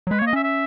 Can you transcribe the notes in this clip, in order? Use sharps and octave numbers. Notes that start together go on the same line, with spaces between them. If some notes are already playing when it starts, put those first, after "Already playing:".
F#3
G#3 B4
A#3 C#5
D#5
C#4 E5
E5